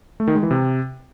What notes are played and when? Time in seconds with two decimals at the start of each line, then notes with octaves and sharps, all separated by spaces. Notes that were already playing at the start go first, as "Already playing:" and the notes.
0.20 A3
0.27 D#3
0.35 G#3
0.43 E3
0.51 C3